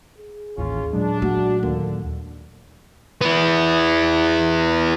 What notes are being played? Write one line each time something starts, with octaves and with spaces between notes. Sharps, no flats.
G#4
A1 D#2 C#3 C#4 F4
A#2 F#3 G#3 D4
A3 F#4
D#2 D3 A#3
B3 E4